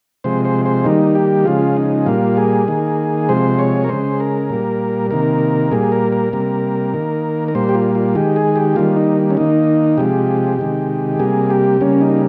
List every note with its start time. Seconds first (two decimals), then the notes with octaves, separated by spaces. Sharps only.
0.24 C3 F3 G#3 C5
0.45 C5
0.65 C5
0.85 D#3 G3 A#3 D#4
1.15 G4
1.45 C#3 F3 G#3 F4
1.77 D#4
2.06 A#2 G3 A#3 F4
2.37 G#4
2.68 D#3 A#3
3.29 C3 F3 G#3 C5
3.59 C#5
3.84 A#4
3.89 C#3 G#3 C5
4.20 A#4
4.50 A#2 G3 A#3
5.11 C3 D#3 A#3 A#4
5.71 A#2 G3 A#3 G#4
5.92 A#4
6.12 A#4
6.33 C3 G3 A#3
6.94 D#3 A#3
7.48 A#4
7.55 A#2 G3 A#3 C5
7.69 G4
7.75 F4
7.95 F4
8.15 D#3 G#3 G4
8.36 G#4
8.56 G4
8.76 D#3 G3 A#3 F4
8.96 D#4
9.30 C#4
9.37 D#3 A#3 D#4
9.97 C3 F3 G#3 G4
10.59 C3 D#3 G#3
11.19 C3 G3 A#3 G#4
11.50 G4
11.81 C#3 G3 A#3 C#4
12.01 D#4